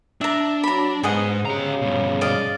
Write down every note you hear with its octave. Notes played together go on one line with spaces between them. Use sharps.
D4 E5 A#5
F#3 A#5 B5
G#2 B3 G#4 D#5 F#5
C#3 G4 A#5
G2 B2
D5 D#5 F5